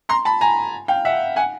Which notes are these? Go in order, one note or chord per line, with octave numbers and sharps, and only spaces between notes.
A#5 C6
A5 B5
G#5 A#5
F5 G5
E5 F#5
F#5 G#5